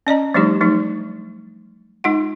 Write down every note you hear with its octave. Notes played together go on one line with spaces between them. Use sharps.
C#4 D5 D#5 A#5
F3 G3 A3 D4 D#4 G4
F3 F#3 A3 D#4
G#3 D#4 F4 F#5